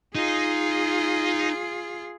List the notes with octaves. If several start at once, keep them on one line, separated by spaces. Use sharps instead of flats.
D#4 F4 G#4